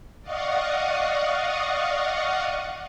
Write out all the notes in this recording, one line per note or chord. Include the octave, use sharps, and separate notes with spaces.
D5 D#5 F5 F#5 C#6 D#6